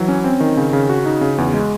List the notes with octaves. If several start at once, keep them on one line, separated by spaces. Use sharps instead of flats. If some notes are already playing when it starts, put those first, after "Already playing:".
Already playing: E3 F#3
C#4
C4
D#3
C#3
C#3
F#4
D#4
C#3
E2
G#3